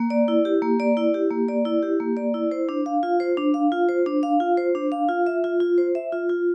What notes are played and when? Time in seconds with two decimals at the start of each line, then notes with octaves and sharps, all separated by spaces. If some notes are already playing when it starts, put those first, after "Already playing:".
Already playing: A#3
0.10 D5
0.28 E4
0.45 G4
0.62 A#3
0.80 D5
0.97 E4
1.14 G4
1.31 A#3
1.48 D5
1.65 E4
1.83 G4
2.00 A#3
2.17 D5
2.34 E4
2.51 C5
2.69 D4
2.86 F5
3.03 F4
3.20 C5
3.37 D4
3.54 F5
3.72 F4
3.89 C5
4.06 D4
4.23 F5
4.40 F4
4.57 C5
4.75 D4
4.92 F5
5.09 F4
5.26 E5
5.44 F4
5.60 F4
5.78 C5
5.95 E5
6.12 F4
6.29 F4